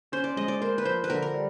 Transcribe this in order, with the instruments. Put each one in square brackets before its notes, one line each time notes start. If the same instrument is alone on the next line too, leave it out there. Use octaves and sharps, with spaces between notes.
[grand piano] C#4 [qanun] C5
[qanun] D5
[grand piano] G#3 [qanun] D#5
[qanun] D5
[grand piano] A#3 [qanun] C5
[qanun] B4
[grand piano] F3 [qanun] C5
[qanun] B4
[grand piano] D3 [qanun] A#4
[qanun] A#4
[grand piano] G3